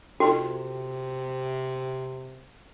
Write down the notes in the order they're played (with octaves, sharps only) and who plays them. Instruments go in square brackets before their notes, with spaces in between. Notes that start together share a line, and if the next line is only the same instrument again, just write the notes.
[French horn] C3 [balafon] F4 A4 G5 [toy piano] F#4